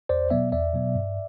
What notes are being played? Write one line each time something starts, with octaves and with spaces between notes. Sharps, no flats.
E2 C5 D5
B2 F#3 B3 D5 E5
E2 D5 E5
B2 F#3 B3
G2